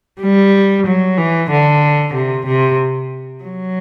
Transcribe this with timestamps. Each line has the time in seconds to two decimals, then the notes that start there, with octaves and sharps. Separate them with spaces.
0.21 G3
0.87 F#3
1.17 E3
1.50 D3
2.14 C3
2.47 C3
3.44 F#3